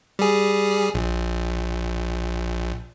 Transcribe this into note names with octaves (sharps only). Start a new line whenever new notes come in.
G3 G#4
A#1